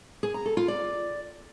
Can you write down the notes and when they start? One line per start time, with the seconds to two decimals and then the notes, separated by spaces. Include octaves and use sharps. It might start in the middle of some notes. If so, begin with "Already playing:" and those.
0.23 G#4
0.34 A#5
0.46 A4
0.57 F4
0.68 D5